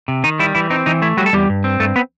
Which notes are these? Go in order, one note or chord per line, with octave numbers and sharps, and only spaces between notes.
C3
D#3 D#4
G3 E4
E3 E4
C4 D#4
E3 D#4
A3 E4
F#3 G3 F#4
A4
E2 G3 G4
G2
C4
G2 A3 A4
B3 B4